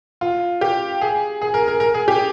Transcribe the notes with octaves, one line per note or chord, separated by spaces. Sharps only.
F4
G4
G#4
G#4
A#4
A#4
A#4
G#4
G4